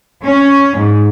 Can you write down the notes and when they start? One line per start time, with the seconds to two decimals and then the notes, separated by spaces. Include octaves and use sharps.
0.23 C#4
0.78 G#2